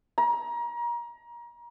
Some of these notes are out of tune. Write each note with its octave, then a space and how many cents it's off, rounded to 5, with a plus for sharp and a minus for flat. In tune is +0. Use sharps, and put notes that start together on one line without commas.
A#5 +30